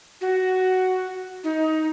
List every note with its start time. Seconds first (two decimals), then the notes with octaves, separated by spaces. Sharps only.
0.21 F#4
1.44 D#4